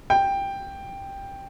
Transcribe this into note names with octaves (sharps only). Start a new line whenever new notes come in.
G5